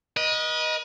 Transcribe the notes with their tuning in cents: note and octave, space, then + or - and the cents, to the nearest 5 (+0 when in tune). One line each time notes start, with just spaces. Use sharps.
B4 -45 D#5 +0